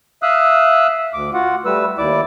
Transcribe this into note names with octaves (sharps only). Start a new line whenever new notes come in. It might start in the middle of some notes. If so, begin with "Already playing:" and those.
E5 F5 D#6 E6 F#6
D2 D6
F4 F#4 F#5
G3 A3 B4 E6
D#2 E4 D5 D6